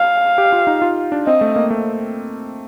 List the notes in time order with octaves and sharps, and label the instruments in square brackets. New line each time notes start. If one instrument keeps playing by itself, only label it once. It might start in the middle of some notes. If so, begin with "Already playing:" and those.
Already playing: [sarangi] F5
[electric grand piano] G4
F4
D#4
F4
D4
[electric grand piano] C4 [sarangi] D#5
[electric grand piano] A3
A#3
A3